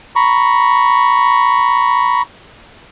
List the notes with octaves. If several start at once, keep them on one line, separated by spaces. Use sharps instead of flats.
A#5 B5 C#6